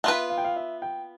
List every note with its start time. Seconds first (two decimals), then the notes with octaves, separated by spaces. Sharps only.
0.04 B3 F4 B4 E5
0.30 F5
0.38 G5
0.44 F5
0.56 E5
0.82 G5